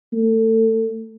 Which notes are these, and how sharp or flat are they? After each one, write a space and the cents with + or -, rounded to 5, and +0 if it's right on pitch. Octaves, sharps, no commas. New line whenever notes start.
A3 +25